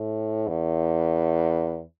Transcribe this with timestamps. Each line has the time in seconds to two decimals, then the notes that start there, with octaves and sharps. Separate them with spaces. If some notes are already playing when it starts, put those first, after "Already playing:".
Already playing: A2
0.48 E2